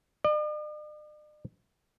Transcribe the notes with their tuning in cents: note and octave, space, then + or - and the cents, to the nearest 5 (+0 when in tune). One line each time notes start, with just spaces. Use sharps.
D5 +45